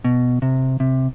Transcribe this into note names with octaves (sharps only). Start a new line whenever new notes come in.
B2
C3
C3